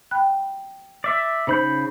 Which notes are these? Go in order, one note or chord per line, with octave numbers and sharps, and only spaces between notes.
G5 B5 F#6
D5 E5
C#3 D#4 C5 B5 G6